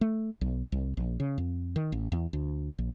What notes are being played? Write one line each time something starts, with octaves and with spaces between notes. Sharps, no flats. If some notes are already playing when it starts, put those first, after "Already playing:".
A3
B1
C2
A#1
C#3
F2
D#3
A1
E2
D2
A#1